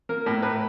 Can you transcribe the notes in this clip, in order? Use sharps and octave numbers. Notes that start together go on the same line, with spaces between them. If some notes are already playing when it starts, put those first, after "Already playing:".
A#3 A#4
A2 A#4
A2 B4